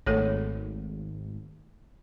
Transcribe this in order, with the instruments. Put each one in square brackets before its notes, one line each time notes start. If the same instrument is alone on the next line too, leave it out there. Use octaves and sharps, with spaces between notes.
[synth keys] G#1 [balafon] A3 A4 C#5